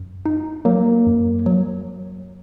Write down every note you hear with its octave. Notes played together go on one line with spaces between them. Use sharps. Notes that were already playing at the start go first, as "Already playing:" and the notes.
Already playing: F#2
D#4
F#3 A#3
F#2
F#3